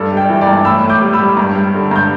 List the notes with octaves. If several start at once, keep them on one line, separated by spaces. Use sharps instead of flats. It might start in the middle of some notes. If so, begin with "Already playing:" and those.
Already playing: G2 A4 D5
G3
D5 G5
E3
D5 G5
G2
A2 B5 E6
A2
D6 G6
G3
B5 E6
G3
G2
G3
D3
G2 G6